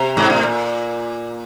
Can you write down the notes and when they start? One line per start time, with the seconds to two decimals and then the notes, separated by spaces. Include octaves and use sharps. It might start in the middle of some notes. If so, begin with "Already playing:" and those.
Already playing: C3
0.17 G#2
0.30 A2
0.43 A#2